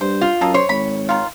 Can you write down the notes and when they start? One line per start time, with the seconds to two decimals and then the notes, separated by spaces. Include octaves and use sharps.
0.01 G2 C5
0.21 F4
0.41 F#2 A#3 A4 D#5
0.54 C5 C#5 C6
0.69 G#1 B5
1.09 D#3 F4